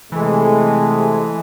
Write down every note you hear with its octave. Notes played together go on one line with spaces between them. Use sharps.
C3 E3 G#3 A3